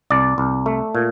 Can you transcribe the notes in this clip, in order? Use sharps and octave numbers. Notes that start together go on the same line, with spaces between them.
C2 D5
C2
A3
A#2